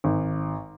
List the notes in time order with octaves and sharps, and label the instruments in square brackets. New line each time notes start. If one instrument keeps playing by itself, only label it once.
[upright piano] G#1